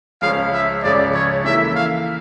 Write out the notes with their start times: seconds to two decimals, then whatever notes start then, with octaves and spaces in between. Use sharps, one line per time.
0.22 C#2 C#3 F3 C#4 F5
0.53 E5
0.83 C#2 C#3 F3 C#4 D5
1.14 C#5
1.44 E3 A#3 E4 A4 E5
1.75 F5